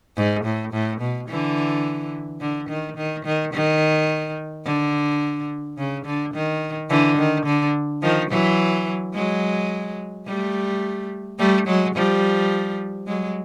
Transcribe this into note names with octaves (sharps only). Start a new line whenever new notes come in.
G#2
A2
A2
B2
D3 E3
D3
D#3
D#3
D#3
D#3
D3
C#3
D3
D#3
D3 E3
D#3
D3
D#3 F3
E3 F#3
F#3 G#3
G3 A3
G3 A3
F#3 G#3
F3 G3
F#3 G#3